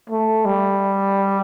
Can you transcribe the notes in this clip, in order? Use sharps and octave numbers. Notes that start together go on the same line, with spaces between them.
A3
G3